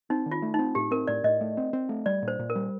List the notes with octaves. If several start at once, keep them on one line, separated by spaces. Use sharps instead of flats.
C4 D#4
D#3
F4
A3
D#4
C4
A2 G4
C4 A#4
A2 D5
A2 D#5
A3
C4
C4
A3
G3 D5
A#2
C5
A#2
A#4
G3